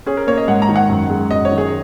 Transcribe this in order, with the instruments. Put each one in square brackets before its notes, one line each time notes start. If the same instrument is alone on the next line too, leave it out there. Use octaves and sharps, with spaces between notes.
[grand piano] C#4 [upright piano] G#4
[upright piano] A#4
[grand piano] A#3 [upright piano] C#5
[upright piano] D#5
[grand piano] G#2 [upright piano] F#5
[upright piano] A#5
[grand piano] D#3
[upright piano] F#5
[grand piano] F#2
G#3
[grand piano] F#2 [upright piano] D#5
[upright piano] C#5
[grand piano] D#3
[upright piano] G#4